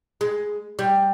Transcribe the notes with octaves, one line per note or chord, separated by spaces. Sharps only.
G#3
G3